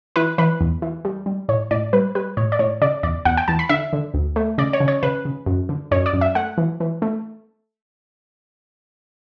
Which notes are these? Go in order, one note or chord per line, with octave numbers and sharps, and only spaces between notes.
E3 B4
E3 B4
E2
E3
G3
G3
A2 C#5
A2 D5
G3 B4
G3 B4
A2 C#5
D5
A2 C#5
C#3 D5
E2 D5
E2 F#5
G5
E2 A5
B5
D3 E5
D3
D2
A3
C#3 D5
C#5
C#3
C#5
C#3 B4
C#3
F#2
D3
F#2 C#5
D5
F#2
E5
A3 F#5
E3
E3
A3